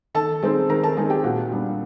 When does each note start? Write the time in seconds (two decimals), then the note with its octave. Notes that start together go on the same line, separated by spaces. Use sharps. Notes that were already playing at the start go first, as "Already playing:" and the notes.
0.14 D#3 A4 A5
0.42 G#3 C4 D#4
0.69 D#3 A#4 A#5
0.83 A4 A5
0.97 G#3 C4 D#4 G#4 G#5
1.10 G4 G5
1.24 A#2 F#4 F#5
1.51 G3 B3 D4